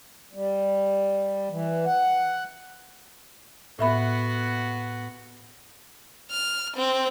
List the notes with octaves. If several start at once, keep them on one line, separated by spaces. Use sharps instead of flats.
G3
E3
F#5
A2 B3 F#4 E5 B5
F6
C4